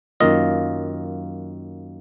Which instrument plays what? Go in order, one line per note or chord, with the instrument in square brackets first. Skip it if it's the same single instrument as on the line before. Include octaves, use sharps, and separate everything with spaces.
[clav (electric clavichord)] F#2 D#3 A#3 F4 D#5